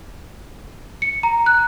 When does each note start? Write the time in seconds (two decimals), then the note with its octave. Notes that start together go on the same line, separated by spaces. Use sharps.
1.02 C#7
1.23 A#5
1.46 F#6